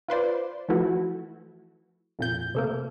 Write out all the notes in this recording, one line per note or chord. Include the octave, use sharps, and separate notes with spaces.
F4 B4 C5 D5
E3 F3 A3 E4 F#4
F2 A#2 G6
C3 A3 A#3